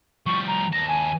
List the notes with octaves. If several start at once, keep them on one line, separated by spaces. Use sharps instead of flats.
F3 G3 C#6
A#5
D#2 A5 A#6
G#5